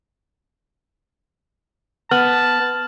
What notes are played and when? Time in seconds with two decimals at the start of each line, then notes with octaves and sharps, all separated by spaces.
2.11 B3 A5 F6 F#7